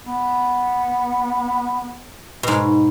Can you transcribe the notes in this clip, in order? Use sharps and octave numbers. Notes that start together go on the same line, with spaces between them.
B3
G#2 B2